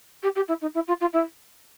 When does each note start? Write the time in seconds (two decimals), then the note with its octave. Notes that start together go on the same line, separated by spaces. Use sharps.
0.22 G4
0.35 G4
0.48 E4
0.61 D#4
0.74 E4
0.87 F4
1.00 F4
1.13 E4